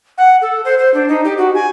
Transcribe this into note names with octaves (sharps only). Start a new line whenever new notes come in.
F#5
A4
C5
C5
D4
D#4
G4
F#4
G#5